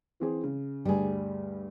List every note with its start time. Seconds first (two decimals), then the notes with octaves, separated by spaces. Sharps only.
0.20 E3 C4 G#4
0.43 C#3
0.85 D2 G2 G3 G#4